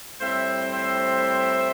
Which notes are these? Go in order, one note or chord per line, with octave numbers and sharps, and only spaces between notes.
A2 G3 C4 C5 E5
C5 E5